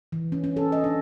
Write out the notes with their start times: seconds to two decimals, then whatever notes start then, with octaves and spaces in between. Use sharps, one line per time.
0.12 E3
0.32 C#4
0.44 C#4
0.57 A4
0.72 D#5
0.84 D4